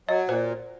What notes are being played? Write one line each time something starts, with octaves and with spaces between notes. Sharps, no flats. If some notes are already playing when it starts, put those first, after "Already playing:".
F#3 D#5
A#2 C5